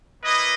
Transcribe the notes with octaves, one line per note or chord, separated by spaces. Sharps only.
A#3 E4 B4 D#5